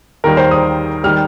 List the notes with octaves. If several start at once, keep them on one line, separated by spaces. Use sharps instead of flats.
D#2 D#3 G3 A#4
C5
D#6
D#3 G3 F6